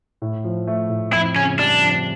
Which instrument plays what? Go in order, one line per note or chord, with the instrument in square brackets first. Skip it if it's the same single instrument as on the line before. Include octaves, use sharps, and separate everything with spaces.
[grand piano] A2
F3
A3
A2
[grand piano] F2 [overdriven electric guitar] E4
[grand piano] C#3 [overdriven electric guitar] C#4
[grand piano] G3 [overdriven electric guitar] D4
[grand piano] F2